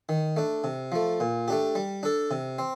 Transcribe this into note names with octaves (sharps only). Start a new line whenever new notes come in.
D#3
A3 D4
C3
F3 A3
A#2
A3 D4 G4
G3
D4 A4
C3
C4